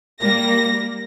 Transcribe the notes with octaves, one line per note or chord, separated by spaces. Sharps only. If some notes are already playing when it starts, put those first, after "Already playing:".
G3 A#3 A#6